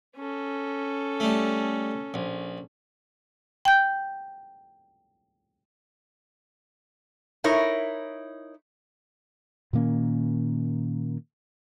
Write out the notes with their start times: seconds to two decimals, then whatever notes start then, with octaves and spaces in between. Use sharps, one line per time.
0.16 C#4 A4
1.20 G3 A3
2.14 A#1
3.65 G5 G6
7.44 D#4 E4 A#4 C#5
9.73 A#2 D#3 A#3 C#4